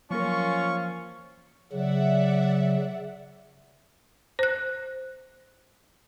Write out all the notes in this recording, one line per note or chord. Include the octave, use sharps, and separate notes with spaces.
F3 F#3 A#3 C#4 F4 A#4 C#6
C#3 F#3 D5 E5 F#5
C5 F#6